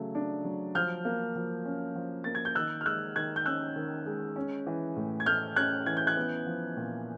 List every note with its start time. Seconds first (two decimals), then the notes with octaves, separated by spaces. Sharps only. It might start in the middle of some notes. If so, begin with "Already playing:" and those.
Already playing: C#3 F#3 A3
0.15 D4
0.45 F#3
0.75 F3 F6 G6
1.05 A#3
1.36 F3
1.65 C#4
1.95 F3
2.24 A#3 A6
2.35 G#6
2.45 G6
2.55 D#3 E6 F#6
2.81 F6
2.86 G#3 E6 F#6
3.16 D#3 F#6 G#6
3.36 G6
3.46 C#4 E6 F#6
3.76 D#3
4.06 G#3
4.36 C#4
4.67 E3
4.96 A2
5.20 G#6
5.26 A3 F6 G6
5.56 C#4 F#6 G#6
5.86 E3 G#6
5.97 G6
6.07 F#6 G#6
6.17 B3
6.47 F3
6.77 A#2